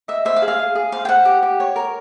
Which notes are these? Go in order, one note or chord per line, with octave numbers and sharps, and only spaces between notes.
D#5 E5
C5 E5
F5
G#4
F5
G#4
G#4
C5 F5
G5
C5 F#5
G4
G4
C#5
A#4